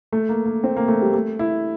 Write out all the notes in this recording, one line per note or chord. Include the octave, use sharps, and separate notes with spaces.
A3
A#3
A#3
C4
A#3
A3
G3
A3
E4